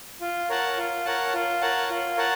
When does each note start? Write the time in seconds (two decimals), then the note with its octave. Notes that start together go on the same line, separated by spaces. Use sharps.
0.21 F4
0.49 A#4 C#5 F#5 A5
0.78 F4
1.05 A#4 C#5 F#5 A5
1.34 F4
1.61 A#4 C#5 F#5 A5
1.90 F4
2.18 A#4 C#5 F#5 A5